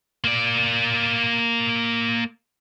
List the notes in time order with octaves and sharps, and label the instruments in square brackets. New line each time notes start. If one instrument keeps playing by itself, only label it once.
[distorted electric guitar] A#3 D5